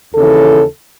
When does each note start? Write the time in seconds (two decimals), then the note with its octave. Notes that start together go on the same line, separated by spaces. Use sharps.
0.14 D#2 C#3 E3 A4